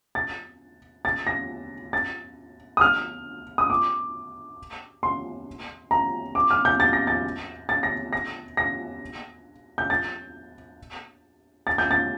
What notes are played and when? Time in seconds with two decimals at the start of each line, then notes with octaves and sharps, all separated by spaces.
0.15 A6
1.05 A6
1.27 A#6
1.93 A6
2.77 D#6
2.81 F6
3.58 D#6
3.70 D6
5.03 C6
5.91 A#5
6.35 D6
6.50 F6
6.65 G6
6.80 A6
6.93 A#6
7.07 A6
7.69 A6
7.83 A#6
8.13 A#6
8.57 A#6
9.78 G6
9.90 A6
11.67 A6
11.78 G6
11.91 A6